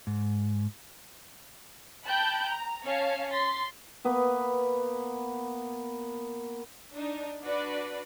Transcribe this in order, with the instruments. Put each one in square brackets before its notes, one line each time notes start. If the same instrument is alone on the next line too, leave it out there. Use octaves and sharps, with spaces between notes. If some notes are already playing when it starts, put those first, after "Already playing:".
[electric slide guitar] G#2
[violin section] G5 A5 B5 F#6 G6
A#5
C#4 C#5 F5 A5
C6 A6 B6
[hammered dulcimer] A#3 B3 B4
[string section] D4 D#4
D4 F#4 B4 D5